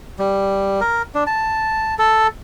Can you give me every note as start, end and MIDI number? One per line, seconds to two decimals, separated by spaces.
0.19 0.80 55
0.80 1.02 70
1.15 1.24 62
1.27 1.95 81
1.99 2.27 69